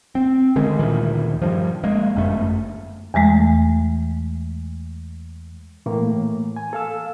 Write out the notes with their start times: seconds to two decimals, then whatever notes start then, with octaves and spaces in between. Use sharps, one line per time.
0.15 C4
0.56 D3 D#3 G#3 C#4
0.79 D2 A#2 D#3 E3
1.42 G2 F3
1.84 G#3 A#3
2.16 G1 F#2 A3
3.14 E2 E3 G#3 A3
5.86 A2 E3 A#3
6.56 G#5
6.73 A4 F5 E6